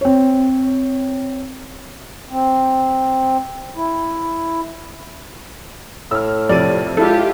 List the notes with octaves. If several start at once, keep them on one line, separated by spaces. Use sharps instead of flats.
C4 C#5
C4
E4
A2 E6 F6
F2 C3 D5 D#7
G#3 E4 F4 G4 A4